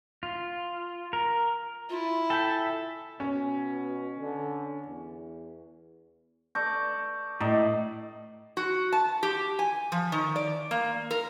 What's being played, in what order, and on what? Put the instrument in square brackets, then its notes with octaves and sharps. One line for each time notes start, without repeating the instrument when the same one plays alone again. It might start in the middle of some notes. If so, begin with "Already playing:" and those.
[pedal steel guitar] F4
A#4
[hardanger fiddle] E4 [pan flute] F4
[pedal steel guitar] A4 [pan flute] E5 [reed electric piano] G5 G#5 G6
[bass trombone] B2 [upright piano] C#4
[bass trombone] D3
E2
[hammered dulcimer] A4 D5 [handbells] C#6 G6 A#6
[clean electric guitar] A2 [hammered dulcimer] D#4 A4 D5
[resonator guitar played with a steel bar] F#4
A5
G4
G#5
F3
D#3
D5
A#3
A#4